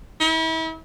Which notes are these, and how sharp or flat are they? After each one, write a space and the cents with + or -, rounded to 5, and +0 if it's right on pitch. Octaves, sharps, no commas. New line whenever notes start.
E4 -40